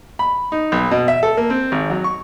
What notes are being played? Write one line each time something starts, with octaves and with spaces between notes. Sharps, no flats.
B5
D#4
B1
B2
E5
A4
A#3
C4
G#1
F#3
C#6